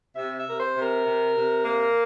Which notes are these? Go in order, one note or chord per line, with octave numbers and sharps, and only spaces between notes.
C3 E5
E5
C3 A#4
C5
C3
A#4
C3
C3
A#3